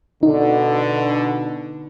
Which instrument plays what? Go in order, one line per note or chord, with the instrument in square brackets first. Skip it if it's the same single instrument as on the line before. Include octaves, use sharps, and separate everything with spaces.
[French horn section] B2 D3 [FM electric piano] D#4